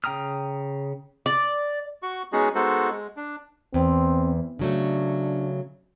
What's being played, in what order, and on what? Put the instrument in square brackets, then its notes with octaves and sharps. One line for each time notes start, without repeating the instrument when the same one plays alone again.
[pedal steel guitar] C#3 G5 A#5 D#6 F6
[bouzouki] D5
[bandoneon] F#4 C#6
G#3 B3 C#4 D#4 F#4 G#4
G#3 B3 D#4 F#4 A4 C5
G#3
D4
[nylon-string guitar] E2 [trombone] C4
[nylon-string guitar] C#3 F#3 A3 [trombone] D4